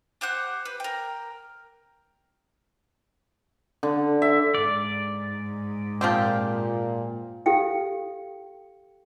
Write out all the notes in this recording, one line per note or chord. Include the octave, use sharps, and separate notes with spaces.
G4 C5 F#5 F#6
B4
A#4 G5
D3
E5
G#2 D5
A#2 F3 C4 G4
G4 A4 F5 G5